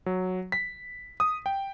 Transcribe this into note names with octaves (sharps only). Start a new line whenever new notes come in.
F#3
B6
D#6
G5